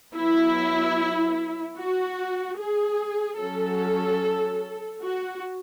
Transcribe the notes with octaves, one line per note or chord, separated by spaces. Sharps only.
F#3 B3 E4
F#4
G#4
F#3 C#4 A4
F#4